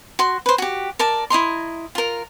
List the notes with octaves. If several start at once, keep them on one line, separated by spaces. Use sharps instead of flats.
F#4 C6
B4 C5
F#4 G4
A#4 D5 A5
E4 D#5 A#5 C6
F4 A#4